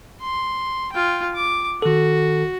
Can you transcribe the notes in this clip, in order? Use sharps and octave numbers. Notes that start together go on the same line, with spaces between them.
C6
F4 G5
D6
D#3 F#4 A4